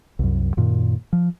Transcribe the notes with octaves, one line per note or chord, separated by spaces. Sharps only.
C2 F#2
F#2 A#2 D#3
F3